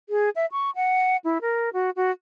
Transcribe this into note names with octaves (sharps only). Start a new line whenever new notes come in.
G#4
E5
C#6
F#5
E4
A#4
F#4
F#4